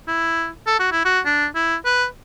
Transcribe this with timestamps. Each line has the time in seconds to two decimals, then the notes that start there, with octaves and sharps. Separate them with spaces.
0.08 E4
0.67 A4
0.79 F#4
0.92 E4
1.05 F#4
1.26 D4
1.55 E4
1.85 B4